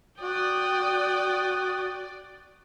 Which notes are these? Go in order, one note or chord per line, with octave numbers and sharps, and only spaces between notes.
F#4 D5 G5 D#6